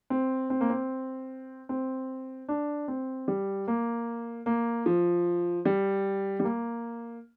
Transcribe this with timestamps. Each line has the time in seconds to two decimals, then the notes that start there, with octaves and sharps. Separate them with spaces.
0.10 C4
0.50 C4
0.61 A#3
0.70 C4
1.69 C4
2.49 D4
2.88 C4
3.28 G3
3.68 A#3
4.46 A#3
4.86 F3
5.65 G3
6.40 G3
6.44 A#3